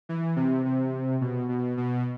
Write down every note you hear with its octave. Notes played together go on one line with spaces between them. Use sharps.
E3
C3
C3
B2
B2
B2